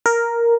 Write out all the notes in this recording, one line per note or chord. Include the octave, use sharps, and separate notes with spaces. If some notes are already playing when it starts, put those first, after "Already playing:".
A#4